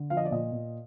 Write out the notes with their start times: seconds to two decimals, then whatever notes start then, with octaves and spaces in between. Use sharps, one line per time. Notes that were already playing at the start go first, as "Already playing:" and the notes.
Already playing: D3
0.10 F3 F5
0.17 D#5
0.25 D5
0.31 A#2 D#5
0.52 A#2